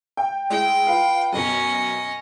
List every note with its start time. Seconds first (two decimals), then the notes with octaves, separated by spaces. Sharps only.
0.17 G5
0.50 G#3 E4 G#4 G5
0.87 F4 B4 F5
1.33 F#2 B2 C#4 D#5